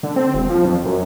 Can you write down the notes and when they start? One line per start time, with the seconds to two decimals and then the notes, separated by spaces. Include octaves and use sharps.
0.03 D3
0.16 C4
0.34 E1
0.49 F3
0.65 F2
0.85 F#2